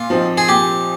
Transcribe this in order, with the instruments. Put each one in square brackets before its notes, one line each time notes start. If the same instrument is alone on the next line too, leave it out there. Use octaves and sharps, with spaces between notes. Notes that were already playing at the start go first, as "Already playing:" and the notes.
Already playing: [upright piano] A#2 [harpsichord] F4
[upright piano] F3 C4 D#4
[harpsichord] G#4
[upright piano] A#2 [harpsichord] G4